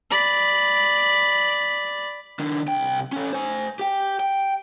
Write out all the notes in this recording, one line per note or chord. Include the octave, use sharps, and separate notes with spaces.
D5 B5
D#3 D4
C2 G5
C#4 A4
C5 G#5
G4 G5
G5